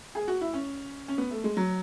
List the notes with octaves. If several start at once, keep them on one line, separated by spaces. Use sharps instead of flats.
G#4
F#4
E4
C#4
C#4
B3
A3
G#3
F#3